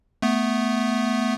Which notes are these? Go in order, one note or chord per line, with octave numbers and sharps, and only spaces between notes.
A3 B3